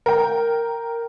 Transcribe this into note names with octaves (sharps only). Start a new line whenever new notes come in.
A#4 G5